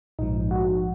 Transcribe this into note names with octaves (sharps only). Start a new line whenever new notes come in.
A#1 G#2 F3 D#4
F#4